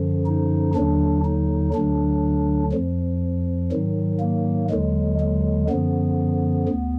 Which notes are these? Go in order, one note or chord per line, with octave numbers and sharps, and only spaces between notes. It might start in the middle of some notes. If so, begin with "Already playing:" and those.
Already playing: F#2 D3 F3
D#4
D#2 D3 F#3 D4
D#4
D2 D3 F#3 D4
F2 F3
G#2 D#3 F#3
A#3
D#2 D3 F#3 G#3
G#3
F#2 D3 F3 B3
D2